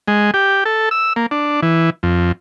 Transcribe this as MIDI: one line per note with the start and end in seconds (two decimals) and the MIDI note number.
0.08 0.31 56
0.34 0.64 67
0.65 0.89 69
0.91 1.13 88
1.16 1.26 58
1.31 1.61 62
1.62 1.90 52
2.03 2.32 41